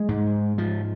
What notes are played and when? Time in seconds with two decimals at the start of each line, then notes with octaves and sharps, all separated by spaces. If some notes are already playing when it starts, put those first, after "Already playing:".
Already playing: G#3
0.09 G#2
0.58 F3